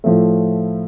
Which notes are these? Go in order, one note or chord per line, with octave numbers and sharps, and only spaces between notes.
A2 F3 A3